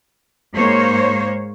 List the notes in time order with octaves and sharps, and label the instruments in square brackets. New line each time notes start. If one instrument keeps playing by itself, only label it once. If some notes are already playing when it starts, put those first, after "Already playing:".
[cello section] G#2 A#3 C5 C#5